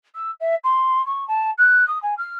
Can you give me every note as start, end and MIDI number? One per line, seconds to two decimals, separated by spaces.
0.14 0.31 88
0.40 0.55 76
0.64 1.04 84
1.06 1.27 85
1.27 1.50 81
1.58 1.87 90
1.87 2.00 87
2.02 2.14 80
2.17 2.37 89